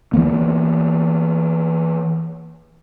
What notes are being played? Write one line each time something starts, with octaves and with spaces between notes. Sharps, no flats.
E3 F3 A#3 B3